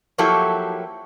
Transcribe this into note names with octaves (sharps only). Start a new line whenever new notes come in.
F3 F#3 A#3 E4 G4 A4